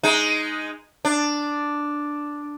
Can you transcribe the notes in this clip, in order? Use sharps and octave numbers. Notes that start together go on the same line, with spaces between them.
G#3 D#4
D4